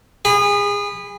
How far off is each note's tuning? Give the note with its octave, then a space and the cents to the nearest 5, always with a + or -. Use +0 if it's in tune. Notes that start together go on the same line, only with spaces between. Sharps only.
G#4 -30 B5 +5